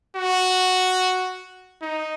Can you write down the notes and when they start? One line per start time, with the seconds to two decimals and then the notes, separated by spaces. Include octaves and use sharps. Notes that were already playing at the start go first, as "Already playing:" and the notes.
0.16 F#4
1.82 D#4